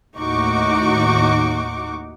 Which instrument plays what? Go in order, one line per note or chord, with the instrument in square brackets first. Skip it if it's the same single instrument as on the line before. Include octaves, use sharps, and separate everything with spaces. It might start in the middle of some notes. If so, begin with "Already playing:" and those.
[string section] D#2 A2 D#4 F#4 C#6 D6